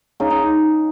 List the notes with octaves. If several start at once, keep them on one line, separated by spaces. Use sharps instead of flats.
C#3 D#4
D#4